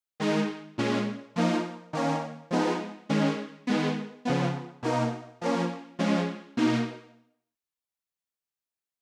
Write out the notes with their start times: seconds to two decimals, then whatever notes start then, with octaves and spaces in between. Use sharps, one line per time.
0.20 D#3 G#3 D#4
0.78 A#2 G#3 C#4
1.36 F3 A#3 D#4
1.93 D#3 A#3 C#4
2.51 F3 G#3 B3 D#4
3.09 D#3 G#3 C#4
3.67 D#3 G#3 B3
4.25 C#3 F3 B3
4.83 B2 A#3 D#4
5.41 F3 A#3 C#4
5.99 F3 G#3 C#4
6.57 B2 A#3 D#4